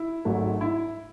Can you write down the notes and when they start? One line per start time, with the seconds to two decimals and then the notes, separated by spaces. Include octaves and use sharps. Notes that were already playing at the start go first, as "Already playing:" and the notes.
Already playing: E4
0.25 G#1 G#2 F#3 A3
0.61 E4